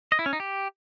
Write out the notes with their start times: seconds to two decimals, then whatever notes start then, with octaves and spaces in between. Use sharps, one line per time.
0.12 D#5
0.19 E4
0.26 C#4
0.33 D#4
0.40 G4